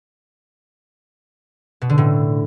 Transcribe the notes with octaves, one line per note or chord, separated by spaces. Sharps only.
B2
D3
A2